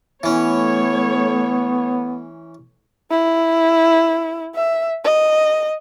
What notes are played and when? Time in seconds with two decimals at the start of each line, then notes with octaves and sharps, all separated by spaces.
0.23 E3 A3 B3 C#4 C#5
3.10 E4
4.55 E5
5.04 D#5